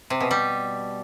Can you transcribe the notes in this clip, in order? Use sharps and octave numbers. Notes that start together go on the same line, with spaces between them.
C3
B2
G3